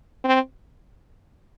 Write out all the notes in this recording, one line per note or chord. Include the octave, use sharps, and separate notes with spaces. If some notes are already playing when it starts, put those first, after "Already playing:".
C4